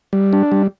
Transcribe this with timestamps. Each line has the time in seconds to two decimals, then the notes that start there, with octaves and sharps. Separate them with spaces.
0.13 G3
0.33 D4
0.52 G3